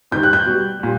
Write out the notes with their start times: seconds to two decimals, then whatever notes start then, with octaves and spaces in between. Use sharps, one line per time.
0.11 C3 D#3 G3 G6
0.23 F#6
0.33 G6
0.45 B2 G3
0.79 A#2 G3